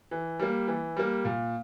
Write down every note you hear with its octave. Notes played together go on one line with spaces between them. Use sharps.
E3
G3 A#3
E3
G3 A#3
A#2